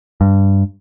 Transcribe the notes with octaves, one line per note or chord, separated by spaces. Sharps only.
G2